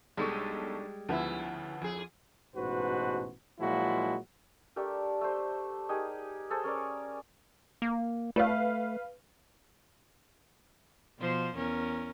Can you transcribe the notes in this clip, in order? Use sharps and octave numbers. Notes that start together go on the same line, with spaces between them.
B1 G3 G#3 D4 D#4 A4 C#6
D2 C#3 F3 B3 E4
F2 G#4
A1 G#2 B2 F#4 B4 C5
A#2 F3 F#3 G#3 E4 F#4
A3 D4 G4 A#4
A3 C5
D#4 G4 G#4 A#4
G#4 A4 C5
C#4 A#4 C#5 D5
A#3
A3 B4 F5
B2 F3 C5
E2 C#4 A#4